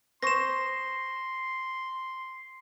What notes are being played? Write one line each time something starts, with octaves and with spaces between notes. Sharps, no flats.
C5 C6 C#6 D#6 A#6 E7